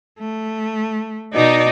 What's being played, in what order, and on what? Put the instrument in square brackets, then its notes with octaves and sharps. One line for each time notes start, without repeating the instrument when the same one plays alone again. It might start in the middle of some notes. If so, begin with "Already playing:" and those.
[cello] A3
[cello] B2 D5 [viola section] D#4